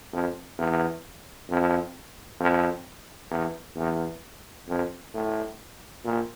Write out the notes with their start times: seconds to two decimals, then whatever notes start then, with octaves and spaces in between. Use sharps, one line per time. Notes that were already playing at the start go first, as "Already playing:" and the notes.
0.13 F2
0.58 E2
1.50 F2
2.40 F2
3.31 E2
3.77 E2
4.68 F2
5.14 A2
6.05 A#2